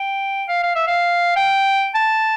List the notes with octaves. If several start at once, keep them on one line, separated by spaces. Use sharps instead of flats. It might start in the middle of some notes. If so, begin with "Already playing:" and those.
Already playing: G5
F5
F5
E5
F5
G5
A5